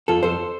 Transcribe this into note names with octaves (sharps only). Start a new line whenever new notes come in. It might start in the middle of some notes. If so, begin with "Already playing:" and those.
F2 F4 A4
F2 A4 C5